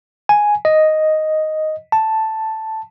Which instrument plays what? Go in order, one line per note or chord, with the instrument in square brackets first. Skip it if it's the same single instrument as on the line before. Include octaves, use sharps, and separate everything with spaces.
[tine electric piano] G#5
D#5
A5